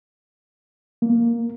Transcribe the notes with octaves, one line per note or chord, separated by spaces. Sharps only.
A#3